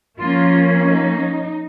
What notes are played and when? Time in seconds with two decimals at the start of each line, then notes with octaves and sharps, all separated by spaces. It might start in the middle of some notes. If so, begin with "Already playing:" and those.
0.18 F3 A#3 C#4 F4
0.85 D#4